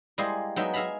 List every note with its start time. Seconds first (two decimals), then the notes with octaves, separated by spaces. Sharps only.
0.18 G3 G#3 A#3 E4 G#4 C5
0.56 F#3 G#3 B3 D#4 E5 G5
0.74 G#4 E5 F5 A#5 B5